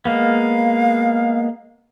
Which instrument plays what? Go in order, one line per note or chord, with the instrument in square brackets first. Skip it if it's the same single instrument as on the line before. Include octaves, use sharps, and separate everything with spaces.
[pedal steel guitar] G#3 A#3 B3 [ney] F5